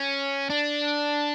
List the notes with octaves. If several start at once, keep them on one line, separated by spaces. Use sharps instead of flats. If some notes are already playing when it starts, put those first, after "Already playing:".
Already playing: C#4
D4